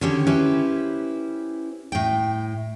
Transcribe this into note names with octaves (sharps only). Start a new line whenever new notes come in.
D3 D#3 C#4 G4 C#5
C#4 E4 G4 B4 C5
A2 G5